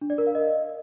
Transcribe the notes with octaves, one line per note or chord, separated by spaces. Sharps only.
D4
D5
A#4
F5
D#5